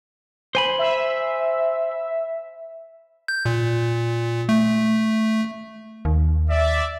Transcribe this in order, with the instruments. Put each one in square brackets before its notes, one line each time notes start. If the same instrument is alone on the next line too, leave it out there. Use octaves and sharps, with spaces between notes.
[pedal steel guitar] C5 G#5 B5
[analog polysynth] E5
[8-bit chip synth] G6
A#2
A3
[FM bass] D#2
[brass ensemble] D5 E5